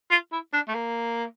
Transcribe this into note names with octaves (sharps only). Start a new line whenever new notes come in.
F4
E4
D4
A3
A#3